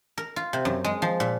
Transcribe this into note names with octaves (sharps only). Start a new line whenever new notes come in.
A#4
F4
C3
F#2
G#3
F3
A#2